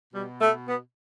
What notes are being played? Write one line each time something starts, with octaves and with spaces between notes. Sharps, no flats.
B2 G3
A3
B3